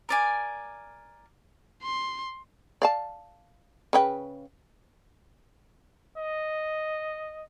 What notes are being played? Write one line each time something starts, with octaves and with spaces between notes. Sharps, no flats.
A#4 D5 G#5
C6
D5 F5 A5
C#3 B4 G5
D#5